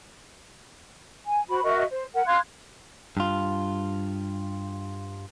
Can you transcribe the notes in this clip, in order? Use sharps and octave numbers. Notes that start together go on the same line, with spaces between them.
G#5
F#4 C5 B5
F#4 A#4 D#5 E5
C5
A#4 F#5
F5 C6 F#6 G#6
G2 F4